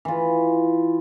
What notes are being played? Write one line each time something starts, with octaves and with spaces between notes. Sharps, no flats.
E3 F4